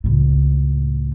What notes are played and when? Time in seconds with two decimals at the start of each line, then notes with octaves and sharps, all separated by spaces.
0.04 C#2 A2